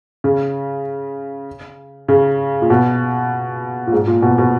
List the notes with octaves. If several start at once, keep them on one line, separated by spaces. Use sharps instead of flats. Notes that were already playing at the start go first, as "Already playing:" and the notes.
C#3
C#3
A#2
B2
A#2
G#2
A#2
B2
B2